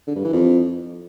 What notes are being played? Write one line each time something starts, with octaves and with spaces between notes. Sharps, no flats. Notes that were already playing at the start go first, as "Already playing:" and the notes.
D3
G2
E3
F2